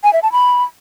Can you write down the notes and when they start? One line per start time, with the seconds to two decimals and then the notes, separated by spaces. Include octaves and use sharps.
0.04 G#5
0.13 E5
0.23 A5
0.32 B5